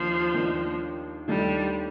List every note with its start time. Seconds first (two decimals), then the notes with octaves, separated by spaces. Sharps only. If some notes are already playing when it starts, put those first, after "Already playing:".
Already playing: D#2 D#3 F3 A#3 D4
0.34 D#2 D#3 A#3 D4
1.28 D#2 D#3 G3 A3 D4 F4